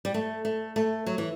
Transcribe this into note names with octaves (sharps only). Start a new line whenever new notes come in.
G3
A3
A3
A3
F#3
E3